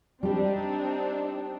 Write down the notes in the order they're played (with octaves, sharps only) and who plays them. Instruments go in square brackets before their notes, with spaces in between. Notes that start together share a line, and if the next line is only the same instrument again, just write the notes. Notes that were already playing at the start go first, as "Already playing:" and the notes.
[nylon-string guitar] G3 G4 [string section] C4 D4 D#4